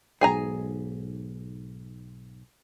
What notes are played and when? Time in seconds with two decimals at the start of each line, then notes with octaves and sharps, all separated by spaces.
0.21 B1 G#2 G#4 G#5 A#5